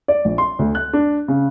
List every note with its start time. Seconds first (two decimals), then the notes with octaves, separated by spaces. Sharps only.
0.08 D5
0.25 A#1
0.38 C6
0.59 D2
0.75 F#6
0.93 D4
1.28 C#3